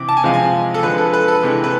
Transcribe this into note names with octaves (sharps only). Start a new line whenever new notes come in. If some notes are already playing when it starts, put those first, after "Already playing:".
Already playing: C3 E3 D6
A5
G#5
C3 F3 G#3 F5
G#5
A4
D3 F3 G#3 B4
A4
B4
A4
C3 E3 G#3
B4